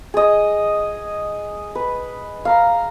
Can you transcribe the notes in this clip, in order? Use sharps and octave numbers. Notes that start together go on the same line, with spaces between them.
G#4 D#5
B4
F5 A#5